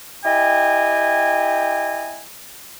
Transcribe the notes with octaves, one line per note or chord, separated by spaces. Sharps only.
E4 G4 D#5 G5 G#5